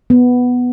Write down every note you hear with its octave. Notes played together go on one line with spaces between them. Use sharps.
B3